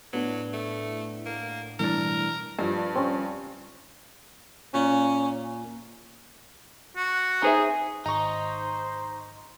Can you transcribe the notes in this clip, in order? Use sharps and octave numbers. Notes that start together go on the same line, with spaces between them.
A2 F#3 B3 D4
A3
A#3
B2 E3 G3 A3 D4 A#4 A6
G2 F3
C4 C#4
A#2 C#4
F#4
D#4 G#4 C5 E5
G#1 D#4 C5 A#5 C#6